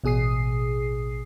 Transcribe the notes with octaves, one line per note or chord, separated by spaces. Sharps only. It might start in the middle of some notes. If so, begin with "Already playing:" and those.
A1 B2 G#4 D#6 C7